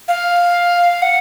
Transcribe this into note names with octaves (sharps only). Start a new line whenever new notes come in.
F5
F#5